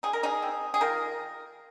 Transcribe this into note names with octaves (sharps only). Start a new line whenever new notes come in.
D#4 G#4
A#4
D#4 G#4
C4
G#4
D#3 F4 A#4